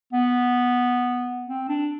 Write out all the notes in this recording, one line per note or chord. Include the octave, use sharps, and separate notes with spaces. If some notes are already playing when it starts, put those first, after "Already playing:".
B3
C4
D4